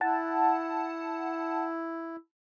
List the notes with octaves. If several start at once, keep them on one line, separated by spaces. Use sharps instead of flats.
E4 F#5 A5